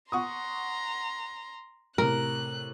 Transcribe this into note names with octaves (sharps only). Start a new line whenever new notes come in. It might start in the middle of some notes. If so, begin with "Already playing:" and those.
F#5 A#5 C6 C#6 D#6
A2 C3 A#4 F#6